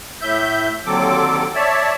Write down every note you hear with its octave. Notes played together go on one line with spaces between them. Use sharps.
A2 E5 G6
D#2 D3 F#3 C4 A4 D6
C#5 D5 E5 A5